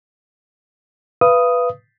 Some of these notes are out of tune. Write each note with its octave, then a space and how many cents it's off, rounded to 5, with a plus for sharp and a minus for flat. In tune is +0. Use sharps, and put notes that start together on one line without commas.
B4 +0 F5 -35 D#6 +0